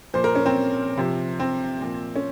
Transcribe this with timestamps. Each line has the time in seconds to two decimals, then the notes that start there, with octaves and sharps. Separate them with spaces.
0.14 A#2 F3 C5
0.24 A#4
0.35 C#4
0.46 C4
0.98 C3 F3
1.40 C4
1.81 A#2 F3
2.16 C#4